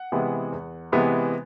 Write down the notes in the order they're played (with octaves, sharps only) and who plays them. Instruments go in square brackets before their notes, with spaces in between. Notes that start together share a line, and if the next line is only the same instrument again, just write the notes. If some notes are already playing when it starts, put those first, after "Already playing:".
Already playing: [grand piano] F#5
C3 E3 G#3 B3
E2
C3 E3 G#3 B3